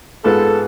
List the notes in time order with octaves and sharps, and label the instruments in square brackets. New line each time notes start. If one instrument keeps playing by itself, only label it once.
[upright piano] G#2 G#3 B3 F4 B4 [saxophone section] A4